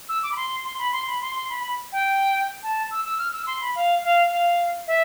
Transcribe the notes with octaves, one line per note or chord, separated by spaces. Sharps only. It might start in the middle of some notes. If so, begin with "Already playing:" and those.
E6
D6
B5
C6
C6
B5
C6
B5
C6
C6
B5
B5
G5
A5
E6
E6
F6
E6
C6
B5
F5
F5
F5
E5